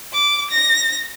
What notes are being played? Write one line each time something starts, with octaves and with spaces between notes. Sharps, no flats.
D6
A#6